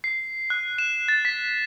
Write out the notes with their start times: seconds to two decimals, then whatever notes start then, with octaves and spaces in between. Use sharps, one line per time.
0.04 C7
0.50 F#6
0.78 E7
1.08 A6
1.25 B6